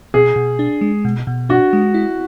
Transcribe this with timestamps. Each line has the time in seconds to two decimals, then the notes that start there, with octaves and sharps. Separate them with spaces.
0.14 B2 G#4
0.36 B2
0.59 D4
0.81 G#3
1.05 B2
1.27 B2
1.49 D4 F#4
1.73 G#3
1.94 E4